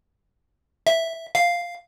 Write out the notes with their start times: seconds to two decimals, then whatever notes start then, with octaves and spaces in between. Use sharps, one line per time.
0.87 E5
1.35 F5